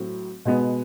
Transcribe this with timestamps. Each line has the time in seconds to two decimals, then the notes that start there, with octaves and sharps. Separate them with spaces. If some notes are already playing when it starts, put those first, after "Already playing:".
Already playing: A2 F#3 C4
0.45 B2 G#3 B3